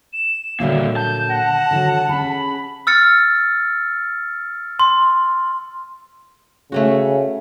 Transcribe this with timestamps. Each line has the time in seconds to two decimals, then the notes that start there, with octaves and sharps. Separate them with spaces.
0.13 E7
0.60 A#2 D3 F#3 G3 A#3 E5
0.96 A5 G6
1.30 F#5 A#6
1.71 D3 F3 F#3
2.09 C#4 G#4 B5
2.87 E6 F6 A6 C#7
4.79 C6
6.72 C#3 A3 C#4 F#4